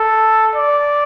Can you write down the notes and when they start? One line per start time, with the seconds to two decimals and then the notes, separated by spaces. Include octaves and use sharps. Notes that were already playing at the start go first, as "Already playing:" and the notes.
Already playing: A4
0.55 D5